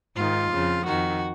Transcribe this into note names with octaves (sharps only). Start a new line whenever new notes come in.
G#2 D#3 F4
F2 C#3
F2 D#3 F#4